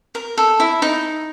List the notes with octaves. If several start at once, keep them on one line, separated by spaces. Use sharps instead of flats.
A#4
A4
E4
D#4